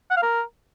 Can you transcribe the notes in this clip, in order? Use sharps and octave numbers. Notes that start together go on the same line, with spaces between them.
F#5
F5
A#4